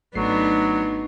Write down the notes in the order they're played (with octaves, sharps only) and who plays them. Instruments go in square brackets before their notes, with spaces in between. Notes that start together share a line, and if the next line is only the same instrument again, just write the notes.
[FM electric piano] G#1 A3 C7 [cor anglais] F#3 [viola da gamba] B3 D4 D#4